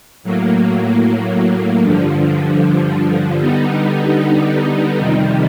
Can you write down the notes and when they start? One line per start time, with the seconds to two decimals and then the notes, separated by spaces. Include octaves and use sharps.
0.24 A2 F#3 A#3
1.82 G2 D3 F3
3.40 D3 G3 B3 D#4
4.99 F2 C3 D#3 G3